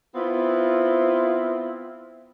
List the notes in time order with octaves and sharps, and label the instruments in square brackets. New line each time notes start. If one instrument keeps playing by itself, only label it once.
[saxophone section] B3 C4 E4 F4